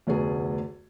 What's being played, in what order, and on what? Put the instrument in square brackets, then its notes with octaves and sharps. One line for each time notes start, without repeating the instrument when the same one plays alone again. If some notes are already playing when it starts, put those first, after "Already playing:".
[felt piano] F1 D2 B3 G#4